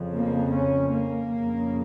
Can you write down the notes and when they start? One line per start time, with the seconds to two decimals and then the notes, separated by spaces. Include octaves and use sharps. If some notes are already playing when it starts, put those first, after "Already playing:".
Already playing: F2 C#3
0.15 A#3
0.54 C#4
0.93 A#3
1.33 F2 C#3